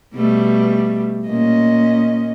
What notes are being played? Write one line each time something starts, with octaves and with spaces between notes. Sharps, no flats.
B2 G3 A3
A#2 C#4 D#5